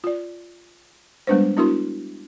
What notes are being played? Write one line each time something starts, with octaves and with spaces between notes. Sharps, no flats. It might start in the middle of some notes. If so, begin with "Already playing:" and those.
F4 D5
G3 G#3 B3 D4 B4 C5
B3 D4 E4 F#4 A#4 C6